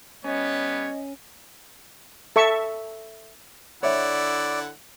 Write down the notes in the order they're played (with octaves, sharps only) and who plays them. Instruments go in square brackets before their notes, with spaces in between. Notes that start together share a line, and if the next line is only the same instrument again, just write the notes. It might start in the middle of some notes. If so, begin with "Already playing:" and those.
[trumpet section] G3 B3 C#5 [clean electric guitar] C#4 [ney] D#5
[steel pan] A4 E5 C#6
[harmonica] D3 E4 F#5 [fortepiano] C#5 E5 [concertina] D5